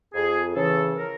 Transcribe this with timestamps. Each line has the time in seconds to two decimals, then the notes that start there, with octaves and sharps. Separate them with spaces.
0.14 F2 G#4
0.55 C#3 E3 A4
0.96 A#4